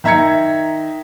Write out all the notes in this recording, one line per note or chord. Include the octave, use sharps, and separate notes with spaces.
D#3 E5 A#5 G#6 C#7